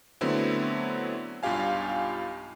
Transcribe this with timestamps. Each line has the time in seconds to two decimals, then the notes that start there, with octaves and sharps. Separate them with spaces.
0.21 D3 F#3 A3 B3 C4 E4
1.43 B1 G2 F4 G4 F5 G#5